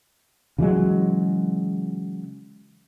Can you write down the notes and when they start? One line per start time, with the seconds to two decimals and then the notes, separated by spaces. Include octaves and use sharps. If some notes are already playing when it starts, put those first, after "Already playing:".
0.58 C#3 E3 F#3 G#3